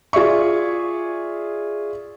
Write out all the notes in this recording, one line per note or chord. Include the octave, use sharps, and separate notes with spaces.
F4 G#4 D5 E5 C#6